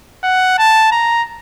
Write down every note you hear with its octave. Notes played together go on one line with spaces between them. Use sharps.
F#5
A5
A#5